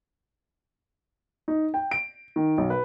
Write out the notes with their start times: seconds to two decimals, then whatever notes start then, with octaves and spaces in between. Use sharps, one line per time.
1.48 D#4
1.74 G5
1.91 D7
2.36 D#3
2.58 B1
2.70 B4